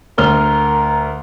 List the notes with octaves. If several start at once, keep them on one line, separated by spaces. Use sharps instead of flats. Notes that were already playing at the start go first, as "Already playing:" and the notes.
D2 A#4 F6 G7